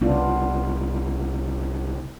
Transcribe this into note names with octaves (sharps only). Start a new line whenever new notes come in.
C2 C#3 B3 D4 F4